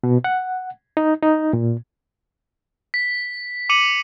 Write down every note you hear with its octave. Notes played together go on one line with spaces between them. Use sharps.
B2
F#5
D#4
D#4
A#2
B6
D6 C#7 D#7 F#7